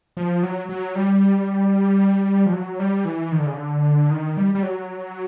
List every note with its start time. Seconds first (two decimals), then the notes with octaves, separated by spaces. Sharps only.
0.17 F3
0.43 F#3
0.69 F#3
0.95 G3
2.46 F3
2.53 F#3
2.79 G3
3.05 E3
3.32 D#3
3.39 D3
3.46 C#3
3.54 D3
4.11 D#3
4.37 G3
4.55 G3
4.63 F#3